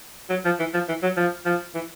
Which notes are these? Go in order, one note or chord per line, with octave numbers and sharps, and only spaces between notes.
F#3
F3
E3
F3
E3
F#3
F3
F3
E3